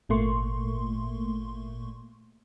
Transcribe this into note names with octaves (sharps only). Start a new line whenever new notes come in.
G#1 A#2 A3 A#3 C6 C#6